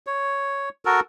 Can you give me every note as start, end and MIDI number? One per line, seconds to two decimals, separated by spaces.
0.07 0.69 73
0.85 1.00 66
0.85 1.00 69
0.85 1.00 70